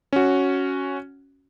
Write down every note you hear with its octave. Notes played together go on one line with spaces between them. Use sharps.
C#4 F#4